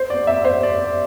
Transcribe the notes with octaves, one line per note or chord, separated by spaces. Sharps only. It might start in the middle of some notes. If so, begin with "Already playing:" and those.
Already playing: C5
D5
E5
C5
D5